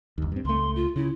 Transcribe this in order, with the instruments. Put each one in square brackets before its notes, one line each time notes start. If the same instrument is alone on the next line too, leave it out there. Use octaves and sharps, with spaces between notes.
[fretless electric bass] G1 D#2
G2 C4
[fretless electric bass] C#2 A3 [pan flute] C6
[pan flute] F4
[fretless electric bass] C#3 [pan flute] E4